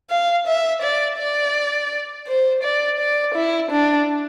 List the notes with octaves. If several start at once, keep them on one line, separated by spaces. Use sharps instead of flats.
F5
E5
D5
D5
C5
D5
D5
E4
D4